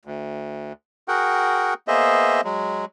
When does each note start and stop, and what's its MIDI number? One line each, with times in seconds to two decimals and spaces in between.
0.05 0.72 38
1.08 1.74 66
1.08 1.74 68
1.08 1.74 70
1.08 1.74 78
1.08 1.74 79
1.88 2.41 58
1.88 2.41 59
1.88 2.41 68
1.88 2.41 72
1.88 2.41 75
1.88 2.41 76
2.44 2.85 54
2.44 2.85 56